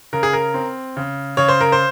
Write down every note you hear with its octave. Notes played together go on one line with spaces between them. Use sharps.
C#3 A#4
G#4
A#4
C4
C#3
C#3 C#5
C5
A#4
C5